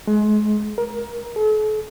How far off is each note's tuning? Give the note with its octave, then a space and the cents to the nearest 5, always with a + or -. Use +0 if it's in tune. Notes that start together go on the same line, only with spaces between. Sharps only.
G#3 +30
A#4 +20
A4 -45